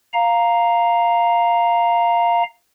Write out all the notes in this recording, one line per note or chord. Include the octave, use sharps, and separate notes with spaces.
F5 A#5